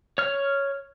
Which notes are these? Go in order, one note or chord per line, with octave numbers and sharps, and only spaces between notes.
C#5 F6